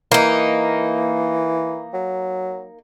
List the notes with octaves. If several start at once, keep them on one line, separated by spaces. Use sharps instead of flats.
E3 A#3 D#4
F#3